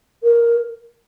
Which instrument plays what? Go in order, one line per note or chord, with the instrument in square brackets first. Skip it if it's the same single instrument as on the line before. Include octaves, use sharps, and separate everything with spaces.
[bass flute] A#4